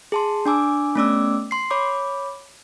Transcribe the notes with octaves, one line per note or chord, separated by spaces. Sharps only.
G#4 A5 C6
D4 G#5 D6 E6
A3 B3 C#4 D5 D6 E6
C6 C7
C#5 B5 D6